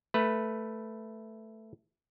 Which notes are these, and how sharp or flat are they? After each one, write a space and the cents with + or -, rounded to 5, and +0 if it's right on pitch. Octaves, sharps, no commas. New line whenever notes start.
A3 +0 B4 +0